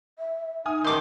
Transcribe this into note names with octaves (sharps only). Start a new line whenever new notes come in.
E5
D#4 G#5 D#6 F6
A1 D#3 A5 C6 D6 G6